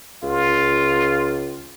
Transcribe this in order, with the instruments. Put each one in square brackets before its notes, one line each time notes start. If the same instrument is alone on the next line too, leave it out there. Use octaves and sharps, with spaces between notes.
[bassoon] C#2 [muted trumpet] F4